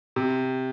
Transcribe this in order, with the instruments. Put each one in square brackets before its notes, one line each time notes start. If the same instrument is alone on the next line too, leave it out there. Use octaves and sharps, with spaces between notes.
[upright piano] C3